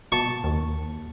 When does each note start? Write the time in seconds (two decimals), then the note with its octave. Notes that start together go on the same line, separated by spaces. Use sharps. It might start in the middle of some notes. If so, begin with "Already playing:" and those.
0.12 B2 A5 C#6
0.44 D#2